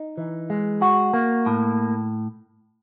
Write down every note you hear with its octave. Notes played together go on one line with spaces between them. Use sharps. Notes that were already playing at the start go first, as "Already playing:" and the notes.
Already playing: D#4
E3
G#3
F#4
A#3
A2